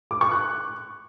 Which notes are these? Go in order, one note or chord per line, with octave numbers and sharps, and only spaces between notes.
D6
C#6
F#6